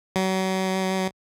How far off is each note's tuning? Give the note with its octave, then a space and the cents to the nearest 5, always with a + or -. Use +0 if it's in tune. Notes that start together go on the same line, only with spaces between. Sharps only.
F#3 +35